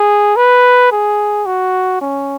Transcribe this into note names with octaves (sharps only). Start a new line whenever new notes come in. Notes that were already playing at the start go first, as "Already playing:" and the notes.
Already playing: G#4
B4
G#4
F#4
C#4